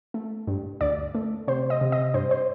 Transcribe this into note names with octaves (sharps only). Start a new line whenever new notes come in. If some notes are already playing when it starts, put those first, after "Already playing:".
A3
G2
D2 D5
A3
C3 C5
D#5
C3
D#5
G2 C5
C5